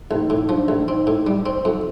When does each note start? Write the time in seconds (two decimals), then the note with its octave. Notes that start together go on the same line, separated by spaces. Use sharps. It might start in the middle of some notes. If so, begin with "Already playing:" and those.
0.11 A1 D#4
0.30 A2
0.49 F3 D4
0.68 A1
0.88 C4 D#4
1.07 A2
1.27 G3 D#4
1.46 C4
1.65 F2